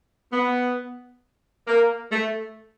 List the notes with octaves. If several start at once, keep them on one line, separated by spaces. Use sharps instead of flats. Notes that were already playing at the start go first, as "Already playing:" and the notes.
B3
A#3
A3